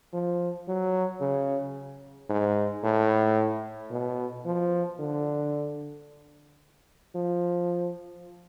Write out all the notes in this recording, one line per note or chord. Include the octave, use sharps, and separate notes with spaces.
F3
F#3
C#3
G#2
A2
B2
F3
D3
F3